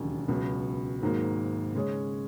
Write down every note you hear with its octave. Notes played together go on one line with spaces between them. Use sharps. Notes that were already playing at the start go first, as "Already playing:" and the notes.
Already playing: E1 D#2 C#3 F#3
C#2 B2 F#3
G#1 G#2 F#3 A#3
C#3 G#3 C#4 G#4 C#5